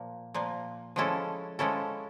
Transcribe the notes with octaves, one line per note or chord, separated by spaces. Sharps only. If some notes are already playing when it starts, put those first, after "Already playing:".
Already playing: A#2 F3 A#3
A#2 F3 A#3
F3 G#3 C#4 E4 A4
F3 G#3 C#4 E4 A4